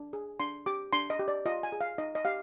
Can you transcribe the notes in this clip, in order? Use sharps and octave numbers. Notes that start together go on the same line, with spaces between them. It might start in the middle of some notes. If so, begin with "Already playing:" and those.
Already playing: D4
G#4
D4 C6
G4 D6
D4 C6
D#5
G4
D5
F4 D#5
G#5
G#4
F5
D#4 D#5
D#5
G4 F5